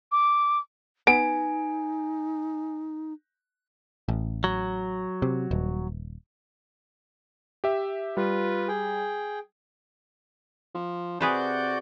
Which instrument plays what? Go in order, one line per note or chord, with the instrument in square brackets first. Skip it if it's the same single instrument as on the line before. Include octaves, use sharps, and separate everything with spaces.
[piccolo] D6
[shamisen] B3 [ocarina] D#4 [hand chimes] G#5 [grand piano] D7
[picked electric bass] A1
[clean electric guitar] F#3
[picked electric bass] C3
D#1
[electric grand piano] G4 E5
[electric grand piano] G3 [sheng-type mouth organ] F4 B4
[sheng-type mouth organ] G#4 G5
[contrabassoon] F3
[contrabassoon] C3 [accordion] F#4 D5 G6 [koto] G#4 B4 C5